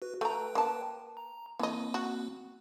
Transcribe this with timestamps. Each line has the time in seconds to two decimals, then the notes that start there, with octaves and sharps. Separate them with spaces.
0.02 F#4 B4
0.21 A3 B4 G5 A#5
0.55 A#3 A5
1.17 A#5
1.59 E3 A#3 C4 D#5
1.94 F#4